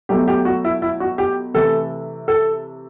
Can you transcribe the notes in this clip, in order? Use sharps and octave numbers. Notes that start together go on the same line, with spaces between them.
B2 F#3 A3 G4
G4
F#4
E4
E4
F#4
G4
C3 E3 A3 A4
A4